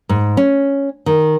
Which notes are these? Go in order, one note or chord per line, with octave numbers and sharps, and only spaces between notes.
G#2
C#4
D#3